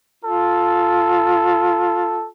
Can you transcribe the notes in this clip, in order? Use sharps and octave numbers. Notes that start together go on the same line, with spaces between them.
F4 A4